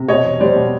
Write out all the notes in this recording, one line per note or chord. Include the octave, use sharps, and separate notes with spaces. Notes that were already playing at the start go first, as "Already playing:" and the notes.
Already playing: C3
B2 C#5 D#5
E2
G3 C5 D5
B2